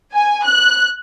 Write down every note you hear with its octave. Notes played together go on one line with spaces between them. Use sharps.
G#5
F#6